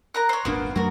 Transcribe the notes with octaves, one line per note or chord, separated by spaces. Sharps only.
A#4 A#5 F#6
C5 C#5
D#1 G#1 A#3 B3 D4 C5
F#2 F#3 A3 F#4 A#4